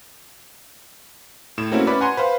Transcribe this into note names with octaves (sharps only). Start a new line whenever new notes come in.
A2 E7
A3 A#3 C4 C#4 E4 F#4
C#4 B4 D5 B5
F#5 G#5 A#5 C6
B4 C5 F5